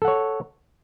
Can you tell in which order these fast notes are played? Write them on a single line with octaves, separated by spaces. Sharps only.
A4 F#5 C#5